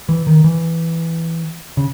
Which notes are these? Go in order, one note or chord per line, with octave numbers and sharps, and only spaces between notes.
E3
D#3
E3
C#3